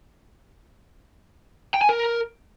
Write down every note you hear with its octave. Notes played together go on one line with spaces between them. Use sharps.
G5
G#5
A#4